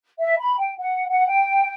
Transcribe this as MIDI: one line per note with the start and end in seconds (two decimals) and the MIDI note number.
0.19 0.35 76
0.39 0.56 83
0.58 0.73 79
0.77 1.06 78
1.08 1.26 78
1.27 1.74 79